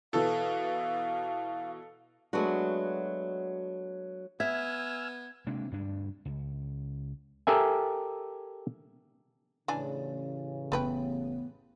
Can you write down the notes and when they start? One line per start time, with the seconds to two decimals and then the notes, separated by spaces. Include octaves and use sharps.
0.13 B2 E3 A4 F5
2.33 F#3 G#3 A3 B3 D4 F#4
4.40 B3 E5 G#5 E6 F6 G#6
5.47 C3 G#3 A#3 D4
5.71 D2 G2 D4
6.25 C#2
7.47 G4 A4 A#4 E5 G#5
9.68 A1 C#3 E3 D4 G#5
10.72 F#1 A3 B3 B4 G5